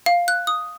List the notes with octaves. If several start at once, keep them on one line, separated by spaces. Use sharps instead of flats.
F5
F#6
D#6